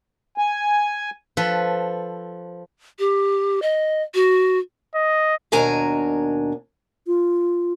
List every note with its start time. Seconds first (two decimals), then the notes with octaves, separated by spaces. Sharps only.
0.38 G#5
1.37 F3 A4 B4
2.99 G4
3.62 D#5
4.15 F#4
4.96 D#5
5.52 D#2 B2 D4 A#4 G#5 A#5
7.07 F4